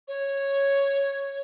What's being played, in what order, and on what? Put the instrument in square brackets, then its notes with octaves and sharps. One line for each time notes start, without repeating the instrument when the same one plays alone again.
[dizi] C#5